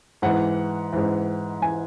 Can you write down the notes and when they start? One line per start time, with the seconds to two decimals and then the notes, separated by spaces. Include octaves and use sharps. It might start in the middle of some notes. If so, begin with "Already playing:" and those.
0.22 G#2 E3 F#5
0.93 G#2 E3
1.62 E3 G#5